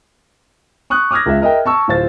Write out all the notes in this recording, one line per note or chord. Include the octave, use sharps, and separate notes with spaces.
C#6 D#6 F#6
D6 D#6 F6 G#6 A#6
C#2 E5
A#4 D#5 E5 G5
A5 C#6 E6
D1 F4 C5 A6